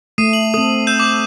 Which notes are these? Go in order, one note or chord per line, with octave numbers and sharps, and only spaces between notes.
A3 D#6 C7 D#7
F#7
C4 A4 D#6
E6 G6 E7
D6